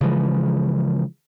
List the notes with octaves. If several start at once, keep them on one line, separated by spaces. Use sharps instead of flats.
C#3 E3 F3 G#3